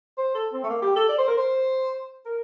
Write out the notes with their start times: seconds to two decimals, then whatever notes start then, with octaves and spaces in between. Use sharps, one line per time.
0.18 C5
0.35 A4
0.52 C4
0.64 A3
0.69 A#3
0.82 G4
0.96 A4
1.09 D5
1.18 C5
1.28 A#4
1.37 C5
2.26 A#4